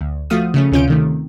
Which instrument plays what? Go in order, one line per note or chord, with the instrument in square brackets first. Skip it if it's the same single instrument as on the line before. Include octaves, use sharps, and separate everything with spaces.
[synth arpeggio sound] D2
F3 A3 F#4 F5 D#6
C#3 A3 C#4
D2 C3 C#4 F4 G6 D7
C3 D#3 A3